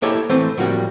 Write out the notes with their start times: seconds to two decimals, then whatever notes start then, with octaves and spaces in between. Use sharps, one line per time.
0.02 A#3 E4 G4 A4 C#5 D#5
0.29 E3 A3 C4 B4 C5
0.57 A2 F3 G3 A#3 F#4